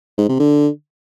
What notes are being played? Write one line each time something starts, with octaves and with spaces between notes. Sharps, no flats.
G#2
C3
D3